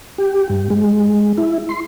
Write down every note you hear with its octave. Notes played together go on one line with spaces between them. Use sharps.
G4
G2
G#3
E4
C6